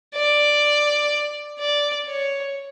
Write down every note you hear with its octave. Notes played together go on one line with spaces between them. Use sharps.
D5
D5
C#5